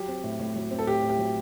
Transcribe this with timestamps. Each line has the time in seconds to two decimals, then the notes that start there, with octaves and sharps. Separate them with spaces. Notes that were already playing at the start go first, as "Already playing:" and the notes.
Already playing: F#3 G4
0.08 C4
0.24 A2
0.40 A2
0.56 F#3
0.71 C4
0.79 A4
0.87 A2 G4
1.02 A2
1.10 G4
1.19 F#3